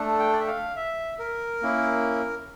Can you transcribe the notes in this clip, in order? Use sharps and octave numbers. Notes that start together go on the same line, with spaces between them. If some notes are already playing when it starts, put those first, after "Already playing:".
Already playing: A3 D4 A4
G5
D5
E5
F5
E5
A#4
A#3 C#4 E4